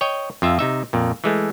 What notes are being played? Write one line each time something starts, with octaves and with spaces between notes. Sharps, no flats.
C#5 D#5 G5
F2 F4 E5
C3 D#4 E5
F2 A#2
E3 G#3 A3